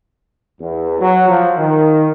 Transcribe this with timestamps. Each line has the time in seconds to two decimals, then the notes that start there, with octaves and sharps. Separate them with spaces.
0.60 E2
1.00 F#3
1.28 F3
1.57 D#3